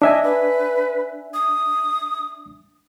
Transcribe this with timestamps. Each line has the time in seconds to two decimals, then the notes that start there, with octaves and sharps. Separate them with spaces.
0.02 D4 D#5 E5 G#5
0.24 B4
1.34 D#6